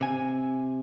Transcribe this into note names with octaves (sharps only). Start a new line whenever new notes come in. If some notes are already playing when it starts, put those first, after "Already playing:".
C3 G#5